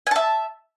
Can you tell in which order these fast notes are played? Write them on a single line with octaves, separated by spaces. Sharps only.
G#5 A5 E5